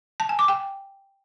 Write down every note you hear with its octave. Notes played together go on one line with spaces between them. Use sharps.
A5
G#5
D6
G5